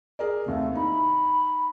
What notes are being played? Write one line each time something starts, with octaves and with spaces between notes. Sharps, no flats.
G#4 A#4 D5
D#2 C3 A3
D#4 B5